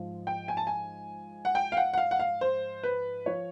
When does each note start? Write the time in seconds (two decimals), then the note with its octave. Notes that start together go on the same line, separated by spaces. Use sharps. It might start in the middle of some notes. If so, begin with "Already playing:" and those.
Already playing: G#2 F3
0.27 G5
0.48 G#5
0.57 A5
0.67 G#5
1.45 F#5
1.55 G5
1.72 F5
1.77 F#5
1.93 F#5
1.98 F5
2.11 F#5
2.20 F5
2.41 C5
2.83 B4
3.26 F3 C#5